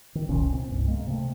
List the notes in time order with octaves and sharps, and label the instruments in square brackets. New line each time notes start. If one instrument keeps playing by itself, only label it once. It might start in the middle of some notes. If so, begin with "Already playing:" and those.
[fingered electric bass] D#3
F1 C2 A#2 C#4
C4
C2 G2
G#3 A#3
C3 A3